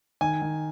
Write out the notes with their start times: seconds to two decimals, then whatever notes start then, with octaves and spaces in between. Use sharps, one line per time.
0.21 D#3 G#5
0.42 D#3